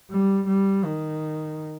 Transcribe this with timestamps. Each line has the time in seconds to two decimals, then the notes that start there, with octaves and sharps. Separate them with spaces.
0.11 G3
0.47 G3
0.84 D#3